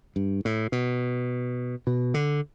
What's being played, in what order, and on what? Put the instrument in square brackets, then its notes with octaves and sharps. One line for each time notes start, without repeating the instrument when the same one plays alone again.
[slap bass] G2
A2
B2
B2
D3